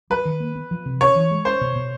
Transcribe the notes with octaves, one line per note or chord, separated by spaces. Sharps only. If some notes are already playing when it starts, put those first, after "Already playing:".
G3 B4
D#3
A#3
B3
F3
C3
C#4 C#5
E3
G#3
C#4 C5
B2
B2